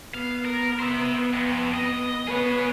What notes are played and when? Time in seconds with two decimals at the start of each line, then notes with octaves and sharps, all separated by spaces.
0.14 B3 F5
0.45 A#4
0.79 C5 E5
1.34 F2
1.74 D#5
2.27 B3 G#4 B4 C#5